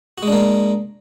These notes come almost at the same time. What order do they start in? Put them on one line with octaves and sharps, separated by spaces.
F#4 G#3 D4 A#3